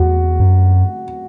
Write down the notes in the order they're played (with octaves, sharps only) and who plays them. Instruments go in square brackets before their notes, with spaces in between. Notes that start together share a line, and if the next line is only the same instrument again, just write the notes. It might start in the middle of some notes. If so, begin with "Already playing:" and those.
Already playing: [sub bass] E2 [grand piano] F#4
[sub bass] F#2